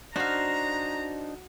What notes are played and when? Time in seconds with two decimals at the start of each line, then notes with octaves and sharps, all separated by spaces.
0.16 D4 D#4 F#4 C5 F5 A#5